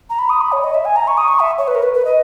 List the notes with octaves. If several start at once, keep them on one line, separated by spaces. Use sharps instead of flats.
A#5
B5
D#6
B5
C#5
D#5
E5
G#5
A#5
C#6
D#6
C#6
E5
C#5
B4
A#4
B4
B4
D#5